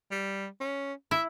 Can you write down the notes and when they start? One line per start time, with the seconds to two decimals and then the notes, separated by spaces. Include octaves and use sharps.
0.11 G3
0.60 C#4
1.11 E4 E5